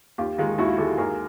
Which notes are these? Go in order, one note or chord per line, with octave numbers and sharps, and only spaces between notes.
D#2 F4 G4
D#3 G#3 D#4 F4
D#2 E4 F#4
D#3 G#3 G4 A4
D#2 G#4 A#4